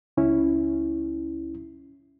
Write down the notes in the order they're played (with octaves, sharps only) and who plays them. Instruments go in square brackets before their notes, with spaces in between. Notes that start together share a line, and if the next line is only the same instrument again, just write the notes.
[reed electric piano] C#2 C#4 E4